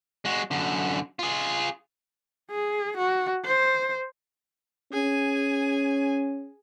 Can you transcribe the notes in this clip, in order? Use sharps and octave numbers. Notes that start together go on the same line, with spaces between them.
G#3 F#4
F#2 D3
F4 G#4
G#4
F#4
C5
C#4 G#4 G#5